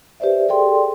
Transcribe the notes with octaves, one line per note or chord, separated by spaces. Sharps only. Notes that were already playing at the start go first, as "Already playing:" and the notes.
G4 B4 C5 D5 E5
G#4 A4 D5 G5 C6